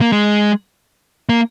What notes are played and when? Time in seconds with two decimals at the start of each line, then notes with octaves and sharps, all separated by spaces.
0.01 A#3
0.12 G#3
1.29 A#3